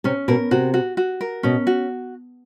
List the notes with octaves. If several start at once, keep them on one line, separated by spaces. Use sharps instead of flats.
C3 C#4
B2 A#4
C3 F#4
F#4
F#4
A#4
B2 C#4
F#4